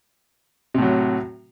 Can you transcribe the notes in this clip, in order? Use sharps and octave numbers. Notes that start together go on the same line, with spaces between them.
A2 C3 F#3